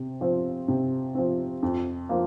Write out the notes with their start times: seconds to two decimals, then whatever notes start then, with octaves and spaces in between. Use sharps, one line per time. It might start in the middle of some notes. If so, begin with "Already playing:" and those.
Already playing: C3
0.21 F3 C4
0.68 C3
1.15 F3 C4
1.63 F2
2.09 F3 A#3